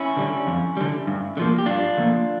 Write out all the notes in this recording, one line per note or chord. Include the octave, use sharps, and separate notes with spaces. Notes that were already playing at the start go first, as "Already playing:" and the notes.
Already playing: C#4 E4
D3 G3
F2
D3 G3
G2
D3
F3 A#3
G4
G2 D4 F4
D3 F3 A#3